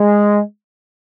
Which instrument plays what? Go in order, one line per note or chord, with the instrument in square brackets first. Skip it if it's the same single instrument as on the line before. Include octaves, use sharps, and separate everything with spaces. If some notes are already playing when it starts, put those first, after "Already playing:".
Already playing: [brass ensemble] G#3